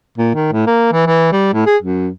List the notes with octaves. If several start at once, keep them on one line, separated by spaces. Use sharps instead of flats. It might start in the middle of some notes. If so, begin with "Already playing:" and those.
A#2
D#3
A2
A#3
E3
E3
G3
A2
G#4
F#2